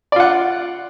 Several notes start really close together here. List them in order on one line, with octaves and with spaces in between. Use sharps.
D5 F4 F#5